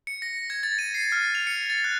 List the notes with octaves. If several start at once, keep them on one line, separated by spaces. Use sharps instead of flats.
C#7
A#6
G#6
A6
D#7
C7
F6
F7
C#7
A6
F#6